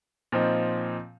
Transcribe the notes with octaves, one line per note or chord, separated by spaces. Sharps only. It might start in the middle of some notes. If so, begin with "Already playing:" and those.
A#2 F3 C4 D#4